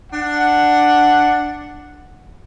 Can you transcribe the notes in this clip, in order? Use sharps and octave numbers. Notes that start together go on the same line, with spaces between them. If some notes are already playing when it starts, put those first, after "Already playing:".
D4 F#5